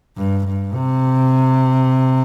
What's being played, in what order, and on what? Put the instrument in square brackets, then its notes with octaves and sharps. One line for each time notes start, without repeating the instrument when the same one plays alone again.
[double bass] G2
G2
C3